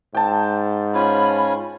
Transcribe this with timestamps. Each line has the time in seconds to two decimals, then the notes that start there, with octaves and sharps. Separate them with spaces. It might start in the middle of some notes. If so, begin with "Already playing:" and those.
0.15 G#2 G5 A5
0.95 C#4 F4 G#5 B5